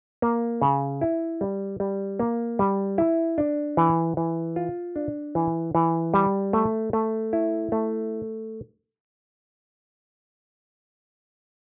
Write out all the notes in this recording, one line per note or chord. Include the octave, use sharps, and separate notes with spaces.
A#3
C#3
E4
G3
G3
A#3
G3
E4
D4
E3
E3
F4
D4
E3
E3
G3
A3
A3
E4
A3